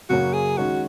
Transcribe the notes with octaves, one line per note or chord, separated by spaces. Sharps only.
F#2 C#3 F#3 A#3 C#4 F#4
G#4
D#3 G#3 C#4 F#4